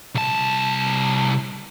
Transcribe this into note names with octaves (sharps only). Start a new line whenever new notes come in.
C2 A5